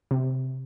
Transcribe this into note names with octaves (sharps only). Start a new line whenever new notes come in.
C3